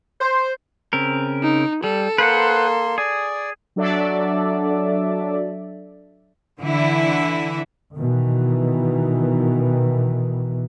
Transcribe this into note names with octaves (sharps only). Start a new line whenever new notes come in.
C5
C#3 C4 A#4
D#4
G3 A4
A#3 B4 C5 F#5 C6
G#4 D5
F#3 D4 A4 D5 E5
D3 E3 E4
B2 D#3 E3